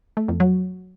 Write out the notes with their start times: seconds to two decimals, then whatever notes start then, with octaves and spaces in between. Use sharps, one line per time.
0.17 A3
0.28 F2
0.40 F#3